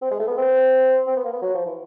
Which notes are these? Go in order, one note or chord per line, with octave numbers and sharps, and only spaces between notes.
C4
G#3
A3
B3
C4
C4
B3
A#3
B3
F#3
F3
E3